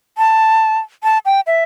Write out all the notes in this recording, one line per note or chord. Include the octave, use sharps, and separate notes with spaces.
A5
A5
G5
E5